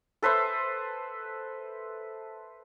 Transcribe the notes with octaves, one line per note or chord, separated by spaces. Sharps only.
A4 B4 C5 E5